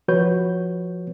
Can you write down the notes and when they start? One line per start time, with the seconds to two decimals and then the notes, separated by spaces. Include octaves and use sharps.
0.08 F3 F#4 B4 C#5 G6